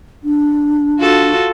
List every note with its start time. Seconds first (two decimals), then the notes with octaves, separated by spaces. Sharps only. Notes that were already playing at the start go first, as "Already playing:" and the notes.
0.23 D4
0.99 F4 F#4 A4